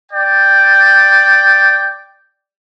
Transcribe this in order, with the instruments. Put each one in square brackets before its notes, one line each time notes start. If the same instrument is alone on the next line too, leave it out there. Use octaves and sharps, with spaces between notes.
[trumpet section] D5 G5